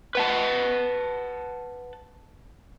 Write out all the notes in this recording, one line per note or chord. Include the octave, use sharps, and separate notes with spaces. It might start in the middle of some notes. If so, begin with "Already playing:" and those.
B4 F#5 A5